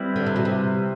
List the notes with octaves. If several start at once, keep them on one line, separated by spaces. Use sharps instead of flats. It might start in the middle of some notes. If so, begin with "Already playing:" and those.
Already playing: G3 C4 E4 B4
D3
C3
B2
C3